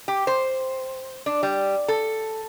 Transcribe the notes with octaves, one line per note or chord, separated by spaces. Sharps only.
G4
C5
D4
G3
A4